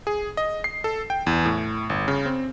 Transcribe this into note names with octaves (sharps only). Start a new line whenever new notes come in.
G#4
D#5
C7
A4
G5
E2
A2
G1
C#3
C4